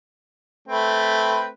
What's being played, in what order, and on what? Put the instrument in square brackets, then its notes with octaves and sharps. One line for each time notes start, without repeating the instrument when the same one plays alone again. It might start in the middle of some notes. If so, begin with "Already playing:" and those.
[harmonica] A3 C4 B4